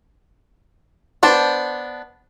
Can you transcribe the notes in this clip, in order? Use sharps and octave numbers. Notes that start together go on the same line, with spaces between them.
B3 D4 C5 A5